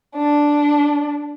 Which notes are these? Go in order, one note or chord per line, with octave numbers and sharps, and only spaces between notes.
D4